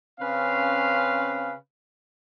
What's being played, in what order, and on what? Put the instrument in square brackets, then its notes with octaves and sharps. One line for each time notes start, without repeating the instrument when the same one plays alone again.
[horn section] C#3 C4 C#4 B4 F5